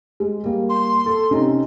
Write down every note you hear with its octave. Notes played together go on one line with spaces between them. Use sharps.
G#3
G3 A#3
C6
A4
C3 C#4 D#4